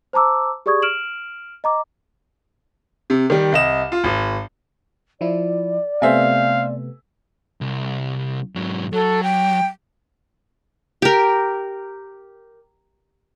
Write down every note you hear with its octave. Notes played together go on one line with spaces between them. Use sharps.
C5 A5 A#5 D6 E6
G4 G#4 D5 C#6 D#6 G#6
F6 D7 E7 F#7
D#5 A#5 D6
C3
D#3 G3
C2 D#5 E7
F4
G#1
F3 E4 D5
C3 A3 B3 C5 E5 F5 G#5
C2
G#2 F#3
F#3 A4
G5
G4 A#4